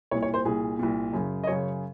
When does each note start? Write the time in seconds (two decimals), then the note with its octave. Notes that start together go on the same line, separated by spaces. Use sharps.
0.11 C2 A#2 C#5
0.23 C#5
0.34 C5
0.45 C2 A#2 G#4
0.79 C2 A#2
1.13 F#2 C#3
1.44 D#5
1.47 F#2 C#3 C#5